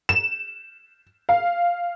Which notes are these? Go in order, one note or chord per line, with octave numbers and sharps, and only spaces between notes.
E7
F5